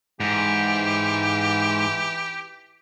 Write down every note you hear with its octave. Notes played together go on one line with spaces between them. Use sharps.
G#2 E3 G4